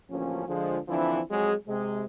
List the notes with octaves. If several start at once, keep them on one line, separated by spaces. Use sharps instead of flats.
A1 D2 F3 A#3 C#4
D3 F3 G#3
D3 E3 F3 C4 D4 E4
F2 F#3 G#3 G#4
C3 G#3